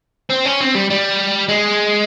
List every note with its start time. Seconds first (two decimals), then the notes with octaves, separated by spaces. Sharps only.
0.30 C4
0.46 C#4
0.61 C4
0.75 G3
0.90 G3
1.49 G#3